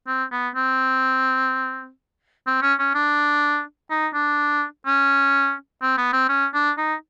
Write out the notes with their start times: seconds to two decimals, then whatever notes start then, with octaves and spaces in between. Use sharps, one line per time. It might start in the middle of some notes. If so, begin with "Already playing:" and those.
0.07 C4
0.32 B3
0.55 C4
2.47 C4
2.62 C#4
2.79 C#4
2.94 D4
3.90 D#4
4.14 D4
4.86 C#4
5.82 C4
5.98 B3
6.13 C4
6.29 C#4
6.54 D4
6.77 D#4